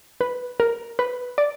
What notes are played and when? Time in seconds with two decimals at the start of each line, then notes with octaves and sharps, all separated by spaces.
0.21 B4
0.60 A#4
0.99 B4
1.38 D5